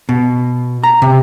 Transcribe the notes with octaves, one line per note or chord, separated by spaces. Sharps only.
B2
A#5
C3